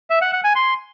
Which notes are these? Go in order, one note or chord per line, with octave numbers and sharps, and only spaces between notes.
E5
F#5
F#5
G#5
C6